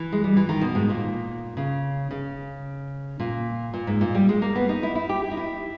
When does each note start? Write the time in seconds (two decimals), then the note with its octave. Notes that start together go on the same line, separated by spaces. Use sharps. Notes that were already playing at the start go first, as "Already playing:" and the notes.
Already playing: E3
0.12 G#3
0.24 G3
0.37 E3
0.49 D#3
0.61 B2
0.75 G#2
0.89 A#2
1.57 C#3
2.11 C#3
3.20 A#2
3.73 A#2
3.87 G#2
4.01 A#2
4.15 G3
4.29 G#3
4.42 A#3
4.56 B3
4.69 D#4
4.83 E4
4.95 E4
5.09 G4
5.24 E4
5.31 D#4
5.37 E4